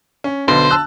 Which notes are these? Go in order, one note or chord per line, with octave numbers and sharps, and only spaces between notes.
C#4
B1 D3 B3 C5
A5 E6 F#6